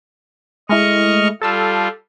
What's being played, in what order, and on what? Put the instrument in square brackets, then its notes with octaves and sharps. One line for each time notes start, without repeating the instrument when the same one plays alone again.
[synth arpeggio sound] G#3 A3 E4 [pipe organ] D#5 C#6 F6
[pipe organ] G3 F4 [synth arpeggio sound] A4 A5 E6